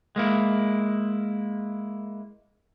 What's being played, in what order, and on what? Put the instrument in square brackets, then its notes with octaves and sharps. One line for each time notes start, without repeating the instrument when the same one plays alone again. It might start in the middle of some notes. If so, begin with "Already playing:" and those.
[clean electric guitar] G#3 A#3 E4